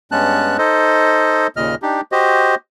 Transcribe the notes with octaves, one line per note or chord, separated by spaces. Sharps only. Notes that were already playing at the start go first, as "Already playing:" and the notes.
G2 G#3 B3 C#4 A5 F#6
D#4 A4 C5 D#5
D#2 A#2 C#3 D#5 F6
D4 D#4 G4
F#4 G4 C5 D#5